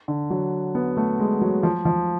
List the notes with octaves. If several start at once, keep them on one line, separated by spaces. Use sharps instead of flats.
D3
F#3
B3
A3
G#3
F#3
F3
F3